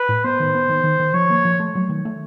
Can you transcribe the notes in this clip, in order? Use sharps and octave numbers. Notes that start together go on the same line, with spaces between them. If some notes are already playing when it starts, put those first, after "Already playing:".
Already playing: B4
A2
B3 C5
D#3
B3
D#3
D#3
D#3
F3 C#5
A#3
F3
A3
F#3
D#3
A3